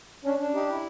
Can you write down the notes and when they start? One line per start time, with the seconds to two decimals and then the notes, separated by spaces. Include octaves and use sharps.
0.24 C#4 D4
0.39 D4
0.54 D#4 G4
0.68 E4